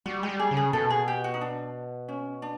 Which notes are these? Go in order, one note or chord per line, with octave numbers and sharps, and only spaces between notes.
G3 F#4
G#3 G4
G3
G#4
C#3
G#4
B2 A4
G#4
G4
F#4
D#4
D4
C#4
D4